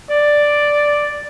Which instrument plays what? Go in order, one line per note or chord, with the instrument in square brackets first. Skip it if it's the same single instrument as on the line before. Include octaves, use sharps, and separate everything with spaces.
[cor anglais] D5